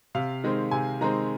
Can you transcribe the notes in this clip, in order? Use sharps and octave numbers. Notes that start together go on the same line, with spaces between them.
C3 F5
D#3 G#3 C4
C3 G#5
D#3 G#3 C4 A#5